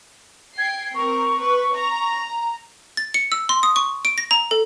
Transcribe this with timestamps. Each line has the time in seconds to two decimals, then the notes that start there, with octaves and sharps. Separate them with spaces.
0.58 G5 G#6 C7
0.95 C4 A#4 C#6
1.42 B4
1.77 A#5
2.97 A6
3.14 C#7
3.32 E6
3.49 C6
3.63 D#6
3.76 C#6
4.05 D7
4.18 A#6
4.31 A#5
4.51 A4